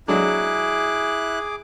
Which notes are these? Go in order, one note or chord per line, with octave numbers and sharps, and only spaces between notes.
F#3 G#3 D4 E4 G#4 D6 F#6